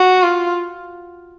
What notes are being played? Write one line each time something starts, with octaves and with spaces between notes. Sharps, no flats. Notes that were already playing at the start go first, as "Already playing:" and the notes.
Already playing: F#4
F4